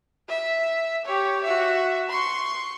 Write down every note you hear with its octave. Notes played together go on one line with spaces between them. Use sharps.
E5
G4 C#5
F#4 E5
C6 C#6